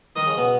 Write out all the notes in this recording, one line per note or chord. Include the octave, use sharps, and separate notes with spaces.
D#3 D#4 D#5
C#3 C#4
B2 B3